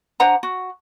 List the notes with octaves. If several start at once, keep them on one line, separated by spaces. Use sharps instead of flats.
D4 C5 F#5 A#5
F#4